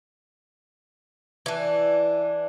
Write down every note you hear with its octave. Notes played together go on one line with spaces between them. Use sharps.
E3 D4